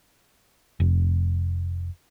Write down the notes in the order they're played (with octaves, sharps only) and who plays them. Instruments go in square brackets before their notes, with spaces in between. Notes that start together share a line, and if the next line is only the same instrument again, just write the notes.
[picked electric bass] F1